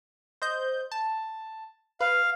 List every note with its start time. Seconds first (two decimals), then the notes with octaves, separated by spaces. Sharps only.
0.42 C5 D#5 G6
0.92 A5
2.00 B4 F5